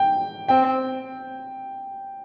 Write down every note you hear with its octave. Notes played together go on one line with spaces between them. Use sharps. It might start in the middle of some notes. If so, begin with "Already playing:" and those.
Already playing: G5
C4 G5